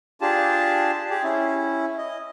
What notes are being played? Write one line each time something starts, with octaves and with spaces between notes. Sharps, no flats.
D4 F4 G4 G#4 A5
G4 G#4
C#4 E4
D#5